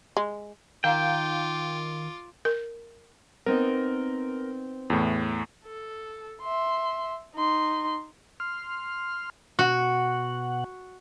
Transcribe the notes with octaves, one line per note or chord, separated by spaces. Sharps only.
G#3
D#3 F4 A#4 F5 G5 A#5 D6
A#4
B3 C4 D#4 A#4
E2 A2
A4
E5 C6
D#4 C6
C6 F6
B2 F#4 F#5